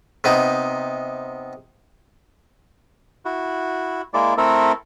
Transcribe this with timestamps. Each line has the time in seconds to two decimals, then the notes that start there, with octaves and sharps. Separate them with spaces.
0.24 C3 B3 D#4
3.25 E4 F#4
4.14 G#3 A#3 E4 D5
4.38 A3 C4 E4 A4 A#4 E5